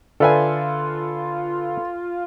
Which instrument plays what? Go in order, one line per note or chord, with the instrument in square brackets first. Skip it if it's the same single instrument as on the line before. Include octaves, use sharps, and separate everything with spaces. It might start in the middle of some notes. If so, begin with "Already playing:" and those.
[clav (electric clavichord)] D3 E5 [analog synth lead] F4 [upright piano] A4 B4 [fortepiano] D5 F5 G#5